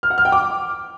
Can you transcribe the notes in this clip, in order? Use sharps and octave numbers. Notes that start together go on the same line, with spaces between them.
F6
F#5
F6
G5
D6